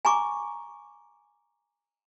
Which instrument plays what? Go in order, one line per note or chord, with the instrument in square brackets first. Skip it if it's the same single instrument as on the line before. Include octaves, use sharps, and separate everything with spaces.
[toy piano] G#5 A#5 C#6 D6